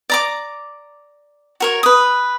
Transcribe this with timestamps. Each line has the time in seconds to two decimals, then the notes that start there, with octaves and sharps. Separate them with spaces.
0.10 D5 A#5 D6
1.60 F#4 A#4 C#5
1.83 B4 D#6